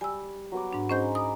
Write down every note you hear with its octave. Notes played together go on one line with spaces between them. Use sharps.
G3 G#5 D#6 E6
F#3 B3 D6
G#2 D4
G#3 C#4 D#4 C5 C6 G6
A#5 B5 D6 D#6